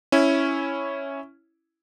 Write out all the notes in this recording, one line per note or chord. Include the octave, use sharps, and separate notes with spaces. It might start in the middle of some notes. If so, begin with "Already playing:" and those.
C#4 E4